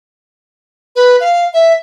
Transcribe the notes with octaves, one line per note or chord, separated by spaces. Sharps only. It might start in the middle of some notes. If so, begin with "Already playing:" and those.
B4
F5
E5